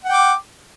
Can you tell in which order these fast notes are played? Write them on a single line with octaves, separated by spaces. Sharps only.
F#5 G5 D6